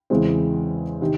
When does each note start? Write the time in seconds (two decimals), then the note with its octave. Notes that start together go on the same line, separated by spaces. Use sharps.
0.10 E2 C#3 E3 G#3 C4
1.01 C3 D#3